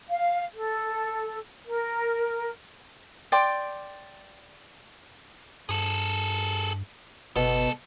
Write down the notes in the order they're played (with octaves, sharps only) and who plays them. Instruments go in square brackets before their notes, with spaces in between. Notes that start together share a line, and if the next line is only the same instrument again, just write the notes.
[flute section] F5
A4
A#4
[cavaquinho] D5 G5 C6 D6
[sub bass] G2 [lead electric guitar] G#4 A4
[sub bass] F#1 [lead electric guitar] G#2 A4 [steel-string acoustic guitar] B2 B3